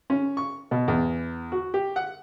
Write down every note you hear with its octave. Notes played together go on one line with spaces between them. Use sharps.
C#4
C#6
B2
E2
F#4
G4
F#5